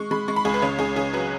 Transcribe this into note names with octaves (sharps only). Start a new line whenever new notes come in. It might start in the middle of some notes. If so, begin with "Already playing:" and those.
Already playing: G#3 C#6
G#3 B5
G#3 C#6
B5
C#2 G#4
B4
C#3 C#5
C#2 G#4
C#3 G#4
F#3 B4